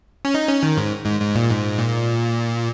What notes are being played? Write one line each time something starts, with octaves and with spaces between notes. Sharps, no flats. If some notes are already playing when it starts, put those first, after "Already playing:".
C#4
D#4
C#4
D#3
G#2
G#2
G#2
A#2
G#2
A#2